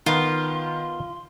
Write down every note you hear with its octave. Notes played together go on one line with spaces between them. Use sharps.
D#3 B3 F4 A#4 C6